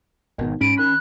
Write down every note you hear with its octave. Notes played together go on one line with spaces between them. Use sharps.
G#1 B2 D#3
G#2 C#4 B5 D7 D#7
D#3 B5 F#6